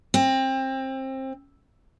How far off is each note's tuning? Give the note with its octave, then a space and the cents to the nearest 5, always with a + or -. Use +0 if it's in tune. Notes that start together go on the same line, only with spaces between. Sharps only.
C4 +25